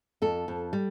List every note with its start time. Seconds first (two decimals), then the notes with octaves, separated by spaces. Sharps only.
0.22 F2 A4
0.48 F2
0.73 G3